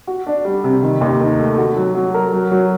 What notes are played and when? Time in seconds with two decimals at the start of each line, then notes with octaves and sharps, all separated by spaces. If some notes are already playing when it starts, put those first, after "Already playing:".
0.07 F#4
0.27 D4
0.45 G3
0.64 C3
0.82 D#3
1.01 D#2
1.20 D#3
1.39 A3
1.58 F#4
1.76 F#3
1.95 F#3
2.14 A#4
2.33 F#3
2.51 F#3